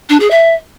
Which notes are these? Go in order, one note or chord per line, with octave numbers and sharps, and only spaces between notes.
D4
G#4
E5